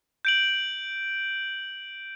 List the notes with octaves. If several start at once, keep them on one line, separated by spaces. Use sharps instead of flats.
G6 D7 F#7